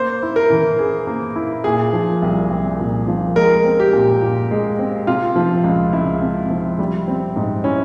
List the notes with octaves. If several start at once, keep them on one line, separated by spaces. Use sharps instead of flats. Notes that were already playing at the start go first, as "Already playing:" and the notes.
Already playing: A#3 C5
E4
A#4
E3
G#4
A#3
E4
A#2 G#4
F3
C2
C2
A#2
F3
G#3 A#4
C4
G4
A#2
A#2
G#3
C4
C3 F4
F3
C#2
C#2 E4
C3
F3
G3
C4
G#2
C#4 E4